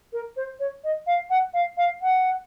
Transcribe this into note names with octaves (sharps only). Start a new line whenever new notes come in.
A#4
C5
C#5
D#5
F5
F#5
F5
F5
F#5